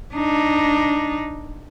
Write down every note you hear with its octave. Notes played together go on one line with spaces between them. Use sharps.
D4 D#4